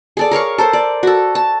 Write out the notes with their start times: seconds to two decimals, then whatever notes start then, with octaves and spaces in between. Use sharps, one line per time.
0.17 G#4 A4 D5
0.31 A#4 C#5 F5 C#6
0.58 A4 A#4 C5
0.73 D5
1.03 F#4 A4
1.35 A5